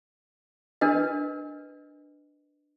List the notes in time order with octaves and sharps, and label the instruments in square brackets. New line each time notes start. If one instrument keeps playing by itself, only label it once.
[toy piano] D4 A#4 B4 D#5